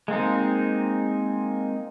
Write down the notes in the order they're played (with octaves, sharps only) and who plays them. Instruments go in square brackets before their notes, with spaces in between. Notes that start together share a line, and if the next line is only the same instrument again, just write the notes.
[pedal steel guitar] G#3 A#3 C4 D#4